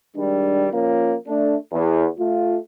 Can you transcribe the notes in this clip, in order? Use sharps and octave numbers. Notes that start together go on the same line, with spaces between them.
D#3 G3 G#3 D4
F3 A#3 C#4 F4
A3 D4
E2
A3 F4